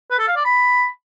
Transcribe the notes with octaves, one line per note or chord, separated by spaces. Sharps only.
B4
A4
F5
D5
B5